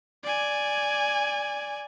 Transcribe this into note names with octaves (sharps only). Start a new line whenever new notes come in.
D5 G#5